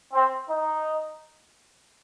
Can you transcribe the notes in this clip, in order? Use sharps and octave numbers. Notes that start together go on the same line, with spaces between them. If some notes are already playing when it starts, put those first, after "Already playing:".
C4
D#4